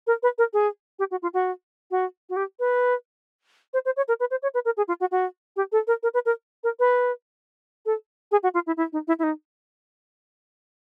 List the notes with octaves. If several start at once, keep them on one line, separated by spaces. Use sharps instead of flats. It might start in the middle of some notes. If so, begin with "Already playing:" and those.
A#4
B4
A#4
G#4
G4
F#4
F4
F#4
F#4
F#4
G4
B4
C5
C5
C#5
A#4
B4
C5
C#5
B4
A#4
G#4
F4
F#4
F#4
G4
A4
A#4
A#4
B4
A#4
A#4
B4
A4
G#4
F#4
F4
E4
E4
D#4
E4
E4
D#4